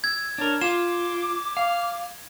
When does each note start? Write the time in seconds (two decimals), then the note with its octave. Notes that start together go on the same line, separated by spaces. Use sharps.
0.04 E6 G#6
0.38 D4 A#4 C#5
0.61 F4 D6 E7
1.57 F5